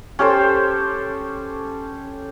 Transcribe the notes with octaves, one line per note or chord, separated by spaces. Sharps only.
C#4 G4 A4 C5